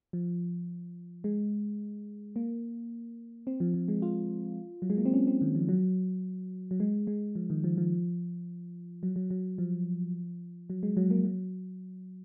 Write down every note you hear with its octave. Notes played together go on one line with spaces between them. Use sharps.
F3
G#3
A#3
C4
F3
F3
G#3
F4
F#3
G#3
A#3
C4
C#4
C4
D#3
F3
F#3
F#3
G#3
G#3
F3
D#3
F3
F3
F#3
F#3
F#3
F3
F#3
G#3
F#3
A#3
F#3